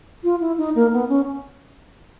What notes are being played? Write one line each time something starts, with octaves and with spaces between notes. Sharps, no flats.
F4
E4
D#4
A#3
B3
C#4